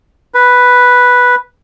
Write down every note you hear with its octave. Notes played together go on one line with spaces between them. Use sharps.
B4